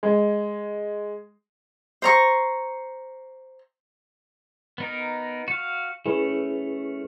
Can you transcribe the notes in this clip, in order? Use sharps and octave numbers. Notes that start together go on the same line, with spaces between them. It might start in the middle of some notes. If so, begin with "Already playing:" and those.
G#3
C5 A#5 C#6
B3 D#4 A#4
F#4 F5
A3 C#4 E4 G#4 B4